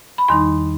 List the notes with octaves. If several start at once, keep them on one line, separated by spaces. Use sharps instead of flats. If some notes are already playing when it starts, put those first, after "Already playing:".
B5
E2 D#3 G3 D#4 C6